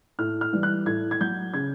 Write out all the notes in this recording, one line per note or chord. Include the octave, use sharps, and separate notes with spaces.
A2 F6
F6
E3 G3
F#6
A2 G#6
G#6
F#3 G6
C#3 G#6